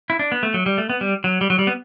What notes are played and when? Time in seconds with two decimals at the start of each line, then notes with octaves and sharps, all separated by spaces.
0.10 E4
0.19 D4
0.32 B3
0.43 A3
0.54 F#3
0.66 G3
0.78 A3
0.90 B3
1.01 G3
1.24 F#3
1.41 G3
1.50 F#3
1.59 G3
1.67 B3